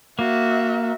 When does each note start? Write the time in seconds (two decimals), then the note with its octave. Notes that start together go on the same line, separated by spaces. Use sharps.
0.19 A#3 F#4 E5